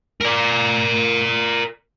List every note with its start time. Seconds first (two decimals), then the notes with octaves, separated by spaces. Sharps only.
0.21 A#4 D5